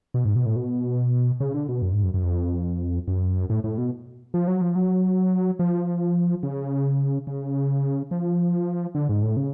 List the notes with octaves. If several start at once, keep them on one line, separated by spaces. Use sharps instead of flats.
B2
G#2
B2
A2
B2
C#3
D3
B2
F#2
G#2
F#2
F#2
F2
F#2
A2
A2
B2
F3
F#3
F3
F#3
F3
C#3
C#3
F3
D3
G#2
A2
C#3